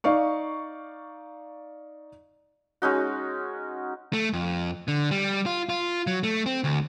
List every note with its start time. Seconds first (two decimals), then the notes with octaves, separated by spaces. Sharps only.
0.04 D#4 D5 F5 C#6
2.82 G#3 C#4 D#4 F#4
4.13 A3
4.33 F2
4.88 D3
5.11 G3
5.46 F4
5.69 F4
6.07 F#3
6.23 A3
6.46 C4
6.64 D2